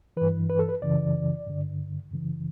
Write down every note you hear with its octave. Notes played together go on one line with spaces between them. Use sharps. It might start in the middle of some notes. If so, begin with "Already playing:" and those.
G2 E3 B4
B4
A4
B4
F#2 C#3 E3 D5
G2 D3
F#2 C#3 E3